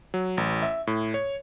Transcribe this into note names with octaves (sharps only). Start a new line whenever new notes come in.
F#3
A1
E5
A2
C#5